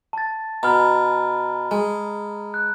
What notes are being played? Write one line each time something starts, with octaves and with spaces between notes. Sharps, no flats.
A5 A6
B2 A#5 B5 F6
G#3
F#6